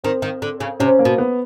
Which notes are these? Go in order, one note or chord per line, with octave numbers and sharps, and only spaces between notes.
D#3 C4
D#3
D3
C#3
C3 C#4
A#3
B2
B3